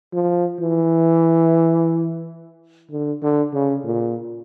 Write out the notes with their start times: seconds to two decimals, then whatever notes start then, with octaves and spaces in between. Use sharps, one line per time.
0.13 F3
0.60 E3
2.91 D3
3.22 D3
3.53 C#3
3.85 A#2